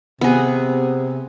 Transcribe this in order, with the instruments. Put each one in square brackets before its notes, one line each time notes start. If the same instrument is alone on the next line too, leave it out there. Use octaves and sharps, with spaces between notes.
[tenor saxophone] C3 [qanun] B3 G#4